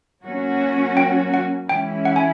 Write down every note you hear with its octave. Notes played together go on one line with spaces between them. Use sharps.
F#3 A#3 C#4 F#4
G5
F#5
E3 G#3 C#4 E4 G5
F#5
G#5